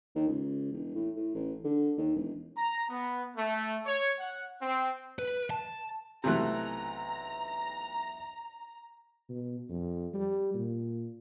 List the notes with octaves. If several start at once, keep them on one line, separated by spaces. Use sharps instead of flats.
D#2
C#2
E1
A2
A2
A1
D3
D#2
E1
A#5
B3
A3
C#5
F#5
C4
B4
A5
B1 C3 E3 A3 A#5 F#6
B2
F2
G3
A#2